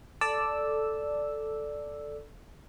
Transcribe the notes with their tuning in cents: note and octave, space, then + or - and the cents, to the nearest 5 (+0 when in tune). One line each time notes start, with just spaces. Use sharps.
A4 +0 D5 +0 E6 +0